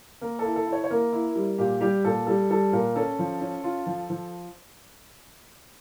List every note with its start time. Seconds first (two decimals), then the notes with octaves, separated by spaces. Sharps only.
0.21 A#3 A#4
0.39 A4
0.45 E4
0.56 A4
0.67 E4
0.72 C#5
0.84 C#5
0.90 A#3 A#4
1.13 E4
1.36 G3
1.58 A#2 G4
1.81 G3 G4
2.04 A#2 A4
2.26 G3 A4
2.50 G3 A4
2.72 A#2 A#4
2.95 C#4 A4
3.19 F3
3.41 C#4
3.64 F4
3.86 F3
4.10 F3